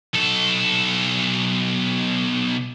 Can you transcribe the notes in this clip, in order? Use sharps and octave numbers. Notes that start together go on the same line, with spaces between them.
B1 A4